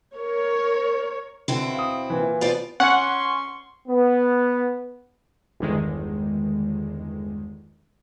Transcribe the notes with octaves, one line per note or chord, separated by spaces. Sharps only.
A#4 C#5
B2 D3 C4 E4
F5 D#6
A#2 E3
B2 B3 F4 C5 D5
C#4 F#5 C6 C#6
B3
G1 E2 D3 D#3 G#3